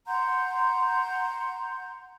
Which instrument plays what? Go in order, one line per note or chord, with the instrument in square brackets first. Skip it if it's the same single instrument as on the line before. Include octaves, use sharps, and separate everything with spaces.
[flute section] F#5 A#5 C6 G6